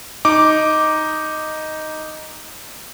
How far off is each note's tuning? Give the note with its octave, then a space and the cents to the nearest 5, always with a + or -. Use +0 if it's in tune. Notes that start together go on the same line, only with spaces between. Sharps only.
D#4 +0 D6 +0